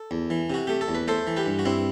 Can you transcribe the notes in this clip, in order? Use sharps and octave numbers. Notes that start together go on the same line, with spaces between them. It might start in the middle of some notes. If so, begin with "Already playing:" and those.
Already playing: A4
E2
E3
C3 F#4
A3 G4
A4
E2
B4
A3 A4 C5
E3
G4 B4
G2
F#4
G2 C4 E4